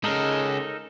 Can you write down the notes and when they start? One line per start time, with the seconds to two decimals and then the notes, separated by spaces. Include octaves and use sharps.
0.04 G#3 C#4 D#4 A4 A#4